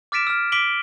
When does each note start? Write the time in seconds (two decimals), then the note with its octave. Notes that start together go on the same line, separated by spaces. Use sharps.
0.12 D6 F6 A6 B6 D7 E7
0.27 E6 F6
0.52 D6 B6 D7 F#7 G7